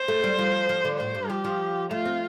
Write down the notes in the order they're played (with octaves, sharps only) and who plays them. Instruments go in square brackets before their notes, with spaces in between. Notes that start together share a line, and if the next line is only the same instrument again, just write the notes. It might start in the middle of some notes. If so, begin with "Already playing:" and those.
Already playing: [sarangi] C5
[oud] A3
G3
F3
F3
D3
[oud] A2 [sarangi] C5
[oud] G2
[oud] F3 [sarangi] G4
[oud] F3
[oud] A3 [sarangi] F4
[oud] C4